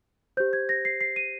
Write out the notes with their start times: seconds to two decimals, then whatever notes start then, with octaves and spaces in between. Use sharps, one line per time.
0.37 C5 G6
0.40 G4
0.53 G#6
0.69 A#6
0.85 C7
1.01 C7
1.16 D#7